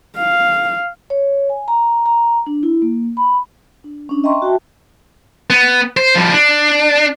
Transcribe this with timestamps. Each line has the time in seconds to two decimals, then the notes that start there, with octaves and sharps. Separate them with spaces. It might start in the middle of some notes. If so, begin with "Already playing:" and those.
0.18 F5
1.10 C#5
1.49 G#5
1.68 A#5
2.06 A#5
2.47 D4
2.63 E4
2.82 A#3
3.17 B5
3.84 D4
4.09 C#4 D4
4.24 D#5 E5 G5 A#5 C6 C#6
4.42 F#4 E5 G5 A5
5.50 B3
5.97 C5
6.16 F3 G3
6.33 D4